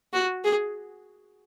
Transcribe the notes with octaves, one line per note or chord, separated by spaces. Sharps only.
F#4
G#4